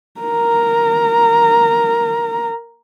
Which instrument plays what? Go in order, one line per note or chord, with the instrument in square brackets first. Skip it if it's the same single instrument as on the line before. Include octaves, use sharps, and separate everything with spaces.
[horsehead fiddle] A#4 A#5